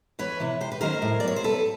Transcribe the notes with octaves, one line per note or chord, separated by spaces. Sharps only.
E2 B4 C#5
C3 E3
C3 C5
B4
D#3 F#3 A#3 C#4 A#4 C5
A2
D5
F#3 B3 C#5
C5
C3 A4 B4